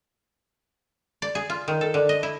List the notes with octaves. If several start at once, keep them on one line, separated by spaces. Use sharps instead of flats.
D5
G#4
F4
D#3
A4
D3
D#5
E4